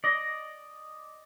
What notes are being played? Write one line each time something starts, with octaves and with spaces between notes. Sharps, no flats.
D5 D#5